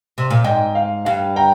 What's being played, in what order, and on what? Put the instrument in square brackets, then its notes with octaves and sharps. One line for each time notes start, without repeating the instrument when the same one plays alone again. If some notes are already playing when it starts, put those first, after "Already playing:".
[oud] C3
A#2
[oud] G#2 [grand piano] D#5 G5
[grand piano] F5
[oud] G2 [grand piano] F5
[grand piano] G5 A#5